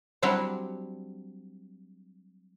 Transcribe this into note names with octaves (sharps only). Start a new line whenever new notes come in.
F#3 G3 C4 D4 E4 F#4